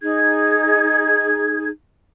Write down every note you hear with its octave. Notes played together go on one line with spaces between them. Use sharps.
D#4 G#4 G#6